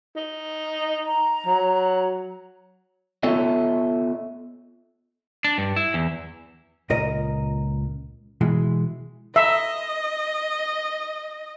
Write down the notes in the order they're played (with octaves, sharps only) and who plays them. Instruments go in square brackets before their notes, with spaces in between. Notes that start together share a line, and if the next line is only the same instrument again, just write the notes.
[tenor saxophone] D#4
[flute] A#5
[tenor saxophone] F#3
[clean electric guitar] B3 F4 A4 C#5 D#5 E5
[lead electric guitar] D4
G2
E4
E2
[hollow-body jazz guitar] C#2 A#2 A#4 D#5
B2 E3 G#3
[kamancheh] D#5 [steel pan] E5